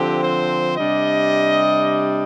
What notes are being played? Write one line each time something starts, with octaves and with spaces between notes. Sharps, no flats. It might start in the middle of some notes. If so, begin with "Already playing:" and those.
Already playing: D3 F3 C4 G4
C5
C3 G3 D4 D#5